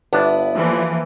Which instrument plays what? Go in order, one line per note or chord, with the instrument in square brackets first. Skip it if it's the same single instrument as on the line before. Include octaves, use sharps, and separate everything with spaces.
[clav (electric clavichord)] G1 D4 F#5 [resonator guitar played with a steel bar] B3 E4
[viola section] E3 F3 A#3